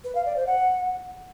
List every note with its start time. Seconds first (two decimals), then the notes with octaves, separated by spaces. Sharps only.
0.04 B4
0.15 F5
0.26 D5
0.36 C5
0.47 F#5